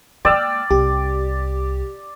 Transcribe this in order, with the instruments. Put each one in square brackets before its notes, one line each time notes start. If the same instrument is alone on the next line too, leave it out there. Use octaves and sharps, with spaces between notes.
[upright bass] G#3 A#3 [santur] D5 [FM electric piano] G5 E6 F6
[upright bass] C2 [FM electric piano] G4